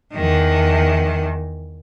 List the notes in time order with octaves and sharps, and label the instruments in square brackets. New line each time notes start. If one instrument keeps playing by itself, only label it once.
[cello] E2 D#3